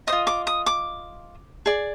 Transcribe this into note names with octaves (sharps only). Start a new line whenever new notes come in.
C5 D#5 D#6
F4
D6
D#6
D6
G#4 D5